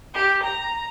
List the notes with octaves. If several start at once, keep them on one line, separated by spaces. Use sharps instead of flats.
G4
A#5